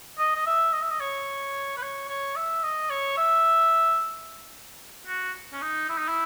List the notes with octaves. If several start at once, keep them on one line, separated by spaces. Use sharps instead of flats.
D#5
D#5
E5
D#5
E5
D#5
C#5
B4
C#5
C#5
E5
D#5
C#5
E5
F#4
C#4
D#4
E4
D#4
E4